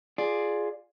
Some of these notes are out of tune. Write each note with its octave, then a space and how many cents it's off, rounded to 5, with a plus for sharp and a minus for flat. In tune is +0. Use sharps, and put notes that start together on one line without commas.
F4 +0 G#4 +10 D5 +10